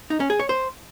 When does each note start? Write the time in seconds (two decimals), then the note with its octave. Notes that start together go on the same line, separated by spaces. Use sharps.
0.10 D#4
0.20 C#4
0.30 G#4
0.40 C#5
0.49 C5